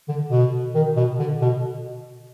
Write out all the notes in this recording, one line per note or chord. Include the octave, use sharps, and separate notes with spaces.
D3
B2
D#3
B2
D3
B2